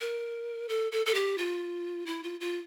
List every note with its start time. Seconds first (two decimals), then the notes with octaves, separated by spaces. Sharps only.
0.01 A#4
0.69 A4
0.92 A4
1.06 A4
1.14 G4
1.38 F4
2.06 E4
2.23 F4
2.41 F4